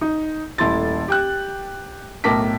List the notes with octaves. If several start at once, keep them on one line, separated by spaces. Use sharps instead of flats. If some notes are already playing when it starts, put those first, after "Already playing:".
D#4
D#1 A3 E4 C6 A6
G4 G5 F#6
B1 A2 A#4 A5 D6 B6